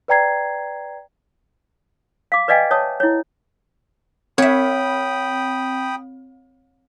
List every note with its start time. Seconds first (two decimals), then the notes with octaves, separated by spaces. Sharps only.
0.08 B4 D5 G5 A#5 G#6 C7
2.32 F5 D6
2.48 B4 D5 D#5 F5 G5 G#5
2.71 C#5 E5 A5 D#6
3.00 E4 C#5
4.38 C4 C#5 E5 G5 B5 D#6